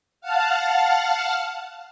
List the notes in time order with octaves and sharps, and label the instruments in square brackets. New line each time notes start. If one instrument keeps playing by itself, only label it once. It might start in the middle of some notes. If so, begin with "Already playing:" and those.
[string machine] F5 F#5 A5 F6